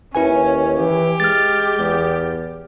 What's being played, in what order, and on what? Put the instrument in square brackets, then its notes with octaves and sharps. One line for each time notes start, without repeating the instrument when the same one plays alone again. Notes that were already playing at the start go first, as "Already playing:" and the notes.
[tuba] D#2 [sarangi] C#4 [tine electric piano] E4 B4 G#5
[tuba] E3 [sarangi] G4
[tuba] G#3 [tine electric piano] F6 A6
[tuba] E2